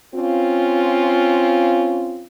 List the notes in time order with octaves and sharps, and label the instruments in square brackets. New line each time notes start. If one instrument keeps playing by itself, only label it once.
[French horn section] C4 C#4 F4